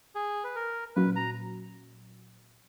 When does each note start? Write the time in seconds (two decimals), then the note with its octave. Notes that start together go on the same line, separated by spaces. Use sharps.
0.15 G#4
0.44 B4
0.56 A#4
0.96 A#2 F#3 C#4 F#4 B4
1.16 A#5